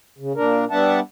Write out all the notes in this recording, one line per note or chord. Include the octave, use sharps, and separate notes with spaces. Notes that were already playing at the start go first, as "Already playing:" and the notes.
C#3
A#2 D4 A#4
G3 B3 D4 E5 F#5 A5